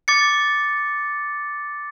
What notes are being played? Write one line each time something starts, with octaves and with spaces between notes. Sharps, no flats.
D6 A6 C#7